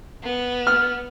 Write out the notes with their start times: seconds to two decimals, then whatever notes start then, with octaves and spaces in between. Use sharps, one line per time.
0.23 B3
0.67 F6